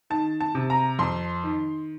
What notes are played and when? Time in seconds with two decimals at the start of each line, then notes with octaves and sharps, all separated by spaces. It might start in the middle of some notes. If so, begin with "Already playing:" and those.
0.10 D#3 A5
0.41 A5
0.55 C3
0.70 A#5
0.99 F2 C6
1.43 D#3